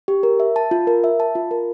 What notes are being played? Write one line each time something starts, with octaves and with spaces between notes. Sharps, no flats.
G4
A#4
E5
A5
F4
A#4
E5
A5
F4
A#4